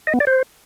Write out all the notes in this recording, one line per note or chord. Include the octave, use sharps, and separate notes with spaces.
D#5
B3
D5
C5